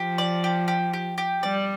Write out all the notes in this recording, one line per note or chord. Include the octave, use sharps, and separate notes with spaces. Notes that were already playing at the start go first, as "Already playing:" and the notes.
Already playing: F3 G4
D5
G4
G4
G4
G4
G3 D5